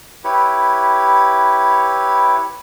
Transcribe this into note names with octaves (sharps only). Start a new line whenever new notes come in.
E4 G4 B4 C#5